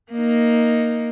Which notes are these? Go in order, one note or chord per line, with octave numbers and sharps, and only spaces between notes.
A#3 D#4